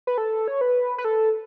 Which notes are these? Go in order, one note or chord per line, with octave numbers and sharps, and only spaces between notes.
B4
A4
C#5
B4
B4
A4